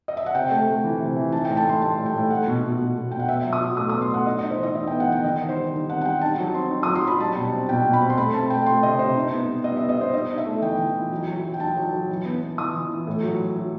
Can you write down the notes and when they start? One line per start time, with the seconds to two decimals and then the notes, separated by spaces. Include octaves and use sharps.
0.08 D#5
0.17 E5
0.26 F#5
0.35 C3 G5
0.51 A3
0.67 A3
0.84 E3
1.00 C3
1.16 E3
1.32 D#4 A5
1.45 A2 G5
1.57 A5
1.65 A2 C6
1.81 G3 A5
1.98 A2
2.06 G5
2.14 A2
2.30 A3 F#5
2.47 B2
2.63 B2
2.79 B2
2.96 B2
3.11 B2 G5
3.20 F#5
3.28 B3 E5
3.44 F#3
3.53 D#6
3.61 F#3
3.77 A2 D#6
3.89 B3 D#6
4.02 C6
4.10 A2 F#5
4.26 D#4 D#5
4.39 D#4 D#5
4.51 C5
4.59 E3 D#5
4.75 D#4 E5
4.87 B3 G5
5.00 F#5
5.07 E3 G5
5.24 D#3 D#5
5.40 D#3
5.49 C5
5.56 G3
5.73 D#3
5.89 C4 F#5
6.01 F#5
6.05 G3 G5
6.21 D#4 A5
6.38 F#3
6.55 C4 C6
6.71 D#4
6.83 F#3 D#6
6.95 C6
7.03 F#3 B5
7.20 G3 A5
7.37 B2
7.53 C4
7.69 B2 G5
7.85 B2
7.93 B5
8.02 C4
8.10 C6
8.17 A3 B5
8.34 C4 A5
8.50 A3 G5
8.66 A3 C6
8.83 C3 D#5
8.99 C3 C5
9.15 D#4
9.31 B3
9.48 G3
9.64 B3 D#5
9.76 B3 E5
9.89 D#5
9.97 B3 C5
10.13 D#4 D#5
10.30 D#4
10.38 E5
10.46 A3
10.62 E3 G5
10.79 E3
10.95 E3
11.11 F#3
11.28 F#3
11.44 F#3
11.54 G5
11.60 D#4 A5
11.77 F#3
11.93 F#3
12.09 E3
12.26 B3
12.42 B3
12.58 E3 D#6
12.74 E3
12.91 E3
13.07 A2
13.23 F#3
13.40 F#3
13.56 F#3